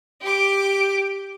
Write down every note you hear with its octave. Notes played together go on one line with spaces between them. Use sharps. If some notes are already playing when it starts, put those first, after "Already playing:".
G4 D6